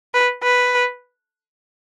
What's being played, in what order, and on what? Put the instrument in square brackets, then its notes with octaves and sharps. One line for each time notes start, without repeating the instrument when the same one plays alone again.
[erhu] B4
B4